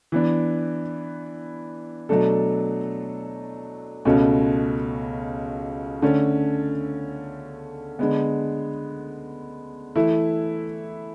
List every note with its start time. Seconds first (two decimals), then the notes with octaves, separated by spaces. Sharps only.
0.12 E3 B3 D4
2.09 B2 F#3 A3 D4 A4
4.05 C#2 B2 A3 C#4 F#4
6.02 D3 A3 C#4
7.99 D3 G#3 B3
9.96 E3 A3 E4